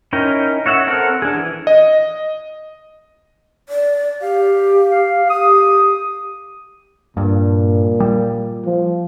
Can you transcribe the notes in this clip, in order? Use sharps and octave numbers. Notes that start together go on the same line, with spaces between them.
C#4 D#4 E4 A#4 G5
F#4 C#5 E5 F#5
C4 A4 A#4 F#5
D4 G#4
E3
D#5
D5
G4 F5
F5
G4 D#6
G2 A#2
G3
F3